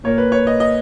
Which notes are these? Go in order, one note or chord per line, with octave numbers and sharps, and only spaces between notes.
A#2 A#3 C#5
B4
C#5
D#5
D#5